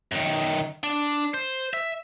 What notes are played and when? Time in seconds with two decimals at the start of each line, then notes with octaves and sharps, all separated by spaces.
0.12 F#2 D#3
0.83 D4
1.34 C5
1.73 E5